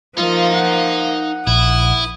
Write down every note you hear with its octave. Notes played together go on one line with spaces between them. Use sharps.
F3 A#3 D#4 F4
F#5
A#1 E4 D#6